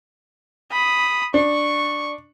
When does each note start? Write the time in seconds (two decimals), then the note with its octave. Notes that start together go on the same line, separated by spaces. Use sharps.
0.72 B5 D#6
1.34 D4 C#6